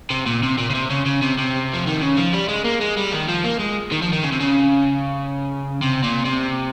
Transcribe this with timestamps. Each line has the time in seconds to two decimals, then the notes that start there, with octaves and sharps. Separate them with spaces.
0.11 C3
0.26 A#2
0.43 C3
0.58 A#2
0.70 C#3
0.74 C3
0.90 C#3
1.06 C#3
1.22 C3
1.38 C3
1.74 F3
1.87 D#3
2.01 C#3
2.17 F3
2.33 G3
2.49 G#3
2.64 A#3
2.81 G#3
2.97 G3
3.12 D#3
3.28 F3
3.44 A#3
3.60 G#3
3.92 D#3
4.02 F3
4.13 D#3
4.23 C#3
4.32 C3
4.40 C#3
5.82 C3
6.03 A#2
6.25 C3